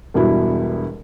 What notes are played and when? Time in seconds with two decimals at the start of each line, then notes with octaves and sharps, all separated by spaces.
0.14 E1 G2 B2 E4